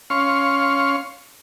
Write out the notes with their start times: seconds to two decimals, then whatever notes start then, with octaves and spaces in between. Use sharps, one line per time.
0.10 C#4 F5 C6 C#6